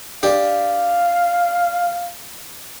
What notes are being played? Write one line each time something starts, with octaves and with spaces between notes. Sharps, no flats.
D4 G4 F5